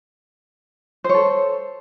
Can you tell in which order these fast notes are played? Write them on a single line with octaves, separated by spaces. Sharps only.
C5 C#5 A4